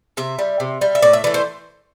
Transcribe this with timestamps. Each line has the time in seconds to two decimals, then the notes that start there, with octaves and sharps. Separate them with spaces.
0.17 C3 E5
0.39 G3
0.60 C3
0.81 G3
0.95 E5
1.02 A2 D5
1.13 E5
1.24 E3 A3 D5
1.34 C5